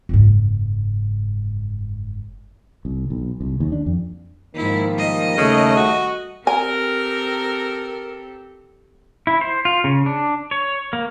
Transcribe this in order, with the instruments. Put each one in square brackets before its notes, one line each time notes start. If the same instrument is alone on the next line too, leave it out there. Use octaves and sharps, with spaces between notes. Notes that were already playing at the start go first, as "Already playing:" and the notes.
[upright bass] F#1 G#2
[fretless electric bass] C2
B1
C2
D#2
D4
F2
[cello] G#2 E4 [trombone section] D#3 F3 A#3
[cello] G3 D#5
[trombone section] D#2 A3 [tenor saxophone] C#3
[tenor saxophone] F#4
[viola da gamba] C4 G4 A4 [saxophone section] A#4 [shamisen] G#5
[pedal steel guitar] E4
C5
F4
C#3
D4
C#5
A#3